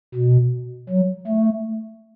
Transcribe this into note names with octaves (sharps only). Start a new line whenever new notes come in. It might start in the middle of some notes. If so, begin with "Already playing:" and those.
B2
F#3
A3